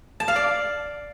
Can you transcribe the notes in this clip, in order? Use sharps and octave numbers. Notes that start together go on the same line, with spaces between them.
A5
F5
D5